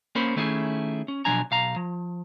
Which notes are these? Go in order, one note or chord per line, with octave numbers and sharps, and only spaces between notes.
A#3 C#4 A#4 C5 C#5 B5
D#3 A3 C#4 E4 F4 G#4
C#4
B2 F3 F#3 D4 G#5 A#5
B1 F5 A#5
F3